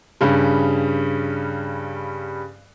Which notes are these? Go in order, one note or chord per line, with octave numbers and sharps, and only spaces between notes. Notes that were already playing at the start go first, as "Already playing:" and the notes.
G2 C#3 G3